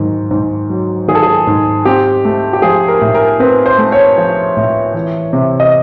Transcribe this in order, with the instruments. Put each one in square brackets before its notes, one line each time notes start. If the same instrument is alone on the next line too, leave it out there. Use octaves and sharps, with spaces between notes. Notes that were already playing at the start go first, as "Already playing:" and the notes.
Already playing: [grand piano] G#2 D#3 F#3
G#2
F#3
D#3 G#4
A4
G#4
G#2
C4 G4
A3
G4
F3 G#4
A#4
A2
A#4
C4 B4
C5
A3
C#5
F3
A2
E3
C3
D#5